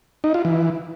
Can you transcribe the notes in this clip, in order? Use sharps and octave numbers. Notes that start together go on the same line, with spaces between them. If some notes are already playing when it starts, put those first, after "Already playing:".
D#4
F4
E3